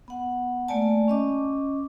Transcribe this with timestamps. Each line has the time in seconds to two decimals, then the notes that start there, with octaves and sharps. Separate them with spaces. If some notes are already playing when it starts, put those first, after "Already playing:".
0.08 B3 F#5
0.68 A3 A#3 D5 G#5 A5
1.08 C#4 D#5 D6